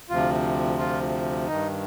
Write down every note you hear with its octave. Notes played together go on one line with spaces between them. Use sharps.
D2 C3 F3 F4
F4
G2 D#3 D#4